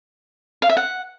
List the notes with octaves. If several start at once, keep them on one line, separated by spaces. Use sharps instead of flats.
F5
E5
F#5